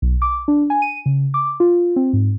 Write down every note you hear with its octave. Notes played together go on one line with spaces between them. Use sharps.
B1
D6
D4
G#5
D#7
C#3
D6
F4
C4
G#2